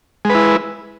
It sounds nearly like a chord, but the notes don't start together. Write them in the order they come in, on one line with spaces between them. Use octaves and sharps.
G#3 B4 E4